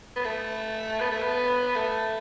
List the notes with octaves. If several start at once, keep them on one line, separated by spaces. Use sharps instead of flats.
B3
A3
B3
A3
B3
A3